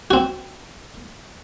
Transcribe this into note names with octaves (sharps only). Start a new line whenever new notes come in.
C4 F#4